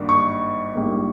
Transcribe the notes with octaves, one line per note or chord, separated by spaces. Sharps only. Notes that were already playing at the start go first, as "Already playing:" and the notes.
Already playing: G#1 G2 G3 A#3
C#6
A#1 G#2 G3 A#3